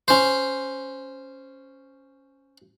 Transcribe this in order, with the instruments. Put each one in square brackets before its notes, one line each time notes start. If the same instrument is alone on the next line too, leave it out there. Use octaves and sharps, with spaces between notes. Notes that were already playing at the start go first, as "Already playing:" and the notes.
[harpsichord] C#4 C5